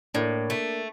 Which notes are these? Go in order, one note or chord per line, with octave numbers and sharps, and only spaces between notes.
A2 A#3 D4
A3